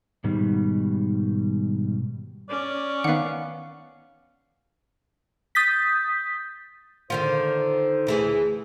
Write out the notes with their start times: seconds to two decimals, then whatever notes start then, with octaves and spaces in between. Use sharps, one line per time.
0.24 G#2 B2 D#3 G3
2.49 C#4 D5
3.04 D#3 B3 F5 F#5
5.55 D#6 G6 A6 B6
7.10 D3 D#3 F4 C5
8.07 D2 E3 G#4